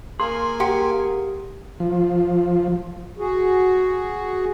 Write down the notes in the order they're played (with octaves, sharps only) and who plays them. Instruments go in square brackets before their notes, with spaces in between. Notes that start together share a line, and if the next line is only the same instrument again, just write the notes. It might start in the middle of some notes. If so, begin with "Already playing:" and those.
[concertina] A#3 G#5 [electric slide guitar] G#4 A#4 [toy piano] C6
[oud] G4 [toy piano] F#5 G5 C6
[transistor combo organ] F3
[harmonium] F#4 G#4